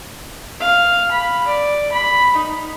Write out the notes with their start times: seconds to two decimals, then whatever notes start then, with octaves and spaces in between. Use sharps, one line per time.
0.60 F5
1.11 B5
1.47 D5
1.92 B5
2.36 D#4